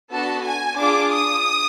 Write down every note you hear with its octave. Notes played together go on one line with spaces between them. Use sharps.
B3 D4 F#4 A4 A5
G#5
D4 F4 G#4 D6
D#6